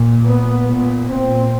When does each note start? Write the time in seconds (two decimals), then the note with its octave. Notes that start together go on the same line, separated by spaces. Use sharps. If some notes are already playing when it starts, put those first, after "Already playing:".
Already playing: A#2
0.27 B3
0.68 A#2
1.09 C4